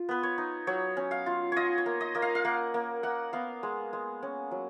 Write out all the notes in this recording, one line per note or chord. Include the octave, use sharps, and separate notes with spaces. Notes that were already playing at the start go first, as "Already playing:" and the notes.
Already playing: F4
B3 B4
C#5
D#4
F#3 C#5
C#4
F5
F4
F4 C#5 D#5
C#5
A#3
D#5
A#3 D#5
F5
F5
A#3 F#5
A#3
A#3 F#5
B3 F5
G#3
G#3
C#4
F#3